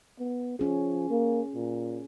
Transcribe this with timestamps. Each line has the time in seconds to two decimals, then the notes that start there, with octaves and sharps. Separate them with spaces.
0.19 B3
0.59 F3 C#4 G#4
1.10 A#3
1.55 A#2